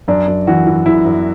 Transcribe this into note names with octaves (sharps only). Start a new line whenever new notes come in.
F#2 D4
F#2
E3 F#4
E3
F#2 E4
F#2